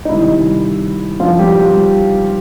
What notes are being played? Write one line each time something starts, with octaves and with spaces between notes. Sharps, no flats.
D#4
C3 D#3 G3 E4
F3 F4
G3 G4